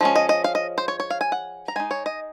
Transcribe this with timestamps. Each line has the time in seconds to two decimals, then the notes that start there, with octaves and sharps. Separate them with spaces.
0.01 F3 G#3 C#4
0.16 D#5
0.29 D#5
0.44 F5
0.55 D#5
0.78 C5
0.88 C#5
1.00 C#5
1.10 F5
1.21 G#5
1.32 F#5
1.68 A#5
1.76 G#3 D#4 G#5
1.91 C#5
2.06 D#5